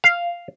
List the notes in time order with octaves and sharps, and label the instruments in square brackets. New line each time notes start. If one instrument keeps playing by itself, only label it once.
[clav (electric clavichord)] F5